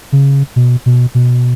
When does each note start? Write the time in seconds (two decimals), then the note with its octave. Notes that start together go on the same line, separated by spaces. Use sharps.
0.12 C#3
0.56 B2
0.86 B2
1.15 B2